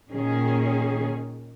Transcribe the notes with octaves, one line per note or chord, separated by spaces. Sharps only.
A#2 D#3 C#4 G#4